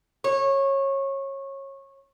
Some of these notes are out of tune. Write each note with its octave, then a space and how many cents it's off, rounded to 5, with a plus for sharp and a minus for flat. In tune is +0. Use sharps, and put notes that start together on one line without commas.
C#5 -20